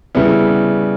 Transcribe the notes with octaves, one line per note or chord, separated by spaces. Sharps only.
C#3 G3 B3 E4